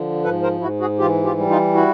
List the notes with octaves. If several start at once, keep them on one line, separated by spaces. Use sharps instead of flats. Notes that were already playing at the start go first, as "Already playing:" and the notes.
Already playing: D3 F3
G#2 A4 B4
A#4 C5
G#2 E4 F#4
F#4 G#4
E3 F4 G4
F4 G4
G3
D#4 F4
E4 F#4